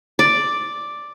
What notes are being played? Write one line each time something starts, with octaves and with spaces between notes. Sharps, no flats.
D5